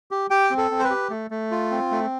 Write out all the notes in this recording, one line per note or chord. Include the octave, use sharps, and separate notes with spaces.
G4
G4 G5
C4
A4
C4
C5
B4
G4
A3
A3
F4
C4
A3